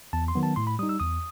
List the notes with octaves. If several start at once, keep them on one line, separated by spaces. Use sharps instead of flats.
E2 A5
C6
D#3 F#3 B3
A5
A2 C6
B5
G3 D#4 D#6
E6
E2 D#6